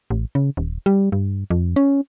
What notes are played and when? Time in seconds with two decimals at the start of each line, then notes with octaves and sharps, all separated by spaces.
0.10 A1
0.35 C#3
0.57 D#1
0.86 G3
1.12 G2
1.50 F2
1.76 C#4